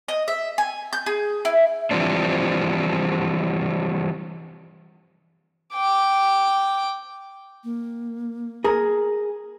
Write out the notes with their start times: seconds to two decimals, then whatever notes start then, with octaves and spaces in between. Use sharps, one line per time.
0.08 D#5
0.28 E5
0.58 G#5
0.93 G6
1.06 G#4
1.45 E4
1.91 E3 F3 G3 C4 D4
5.74 G5 D6
7.64 A#3
8.64 G#4 A#4